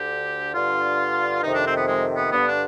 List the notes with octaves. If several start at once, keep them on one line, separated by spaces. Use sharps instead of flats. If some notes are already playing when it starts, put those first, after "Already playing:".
Already playing: D2 D3 G4
G2 D3 F4
F2 C3 D#3 D#4
D4
C4
B3
G#3
B3
G2 D3 B3
D4